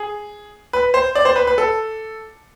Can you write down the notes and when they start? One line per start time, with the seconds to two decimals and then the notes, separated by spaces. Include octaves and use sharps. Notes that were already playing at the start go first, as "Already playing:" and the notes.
Already playing: G#4
0.73 B4
0.94 C5
1.15 D5
1.25 C5
1.36 B4
1.47 B4
1.58 A4